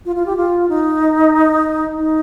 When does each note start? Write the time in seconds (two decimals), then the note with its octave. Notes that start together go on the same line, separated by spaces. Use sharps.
0.06 F4
0.16 F4
0.26 G4
0.37 F4
0.69 D#4
1.98 D#4